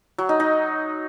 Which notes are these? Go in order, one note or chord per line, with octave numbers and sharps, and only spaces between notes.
F#3
D#4
D#4